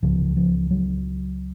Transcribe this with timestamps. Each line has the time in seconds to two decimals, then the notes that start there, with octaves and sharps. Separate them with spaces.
0.02 C#2 C#3 F3
0.37 F3
0.71 F#3